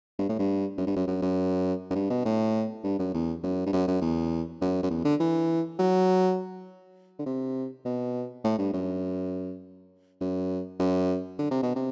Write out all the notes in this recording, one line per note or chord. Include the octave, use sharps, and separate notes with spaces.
G2
A2
G2
F#2
G2
F#2
F#2
F#2
F#2
G2
B2
A2
G2
F#2
E2
F#2
G2
F#2
F#2
E2
F#2
F#2
E2
D3
E3
F#3
D3
C3
B2
A2
G2
F#2
F#2
F#2
D3
C3
B2
C3